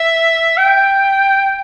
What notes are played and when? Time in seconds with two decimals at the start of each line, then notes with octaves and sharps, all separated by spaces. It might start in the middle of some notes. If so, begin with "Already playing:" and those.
Already playing: E5
0.57 G5